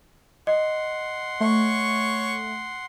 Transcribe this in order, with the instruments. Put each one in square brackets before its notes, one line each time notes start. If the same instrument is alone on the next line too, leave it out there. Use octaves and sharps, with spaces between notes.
[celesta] D#5 [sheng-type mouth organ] F#5 C6
[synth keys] A3 [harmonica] C#5 C#6